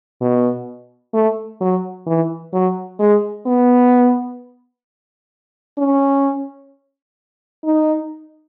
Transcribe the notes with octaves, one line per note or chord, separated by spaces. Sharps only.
B2
A3
F#3
E3
F#3
G#3
B3
C#4
D#4